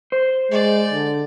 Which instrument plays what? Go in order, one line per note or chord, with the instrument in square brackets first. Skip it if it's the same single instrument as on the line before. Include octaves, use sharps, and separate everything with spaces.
[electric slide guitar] C5
[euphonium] G#3 [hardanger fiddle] D5
[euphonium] D3